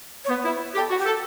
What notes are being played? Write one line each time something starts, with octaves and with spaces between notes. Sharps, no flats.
C#5
B3 B4
E4
G4 A4
F#4
G4
A4